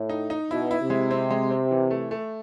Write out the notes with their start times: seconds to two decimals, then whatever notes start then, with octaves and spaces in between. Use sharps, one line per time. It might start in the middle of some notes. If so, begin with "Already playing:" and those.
Already playing: A2
0.09 D#4
0.30 D#4
0.50 B2 E4
0.71 E4
0.81 C3
0.90 G#3
1.11 C4
1.30 G#3
1.50 C4
1.71 E3
1.91 A3
2.11 A3